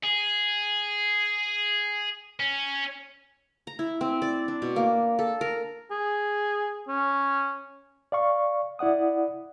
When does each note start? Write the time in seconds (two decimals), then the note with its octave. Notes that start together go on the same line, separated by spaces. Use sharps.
0.03 G#4
2.40 C#4
3.67 A#5
3.79 E4
4.01 C4
4.22 D5
4.48 D4
4.62 B2
4.76 A#3
5.19 A4
5.41 A#4
5.91 G#4
6.88 C#4
8.12 D5 F5 C#6
8.79 E4 D5 F#5 D#6